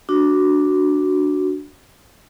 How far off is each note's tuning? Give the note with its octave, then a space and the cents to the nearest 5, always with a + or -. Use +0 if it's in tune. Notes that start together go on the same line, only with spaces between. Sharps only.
D4 +0 F#4 +0